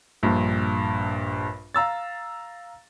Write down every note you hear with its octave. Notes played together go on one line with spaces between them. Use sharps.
A#1 G2 A#2
F5 A#5 E6 A6